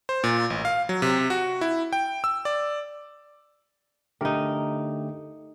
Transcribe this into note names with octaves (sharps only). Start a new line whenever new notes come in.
C5
A#2
A1
F5
F#3
C3
F#4
E4
G5
E6
D5
D3 A3 D#4 G4 A#4